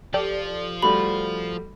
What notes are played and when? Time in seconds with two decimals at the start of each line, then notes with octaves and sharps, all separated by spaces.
0.14 F3 G4 A4 D5
0.82 G3 A3 F#4 B5